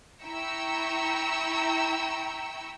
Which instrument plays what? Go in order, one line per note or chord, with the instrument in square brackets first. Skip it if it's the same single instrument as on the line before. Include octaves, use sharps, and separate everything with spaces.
[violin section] E4 G5 A#5 C#6 E6